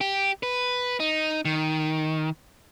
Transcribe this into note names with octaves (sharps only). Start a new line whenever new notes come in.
G4
B4
D#4
D#3